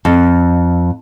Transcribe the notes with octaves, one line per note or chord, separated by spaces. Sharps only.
F2